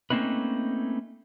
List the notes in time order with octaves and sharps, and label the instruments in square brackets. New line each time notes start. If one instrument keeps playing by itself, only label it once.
[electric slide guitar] A3 A#3 C4 C#4 D#4 B4